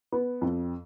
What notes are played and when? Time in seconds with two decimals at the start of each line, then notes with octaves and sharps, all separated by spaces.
0.12 B3
0.41 F2